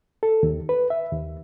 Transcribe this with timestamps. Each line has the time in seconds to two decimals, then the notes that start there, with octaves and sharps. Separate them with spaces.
0.23 A4
0.43 D#2
0.69 B4
0.90 E5
1.12 D#2